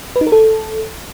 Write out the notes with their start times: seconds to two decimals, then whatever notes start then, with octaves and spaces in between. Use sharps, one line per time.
0.16 B4
0.21 D#4
0.27 A#4
0.32 A4